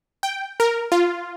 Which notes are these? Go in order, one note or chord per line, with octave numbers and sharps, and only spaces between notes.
G5
A#4
F4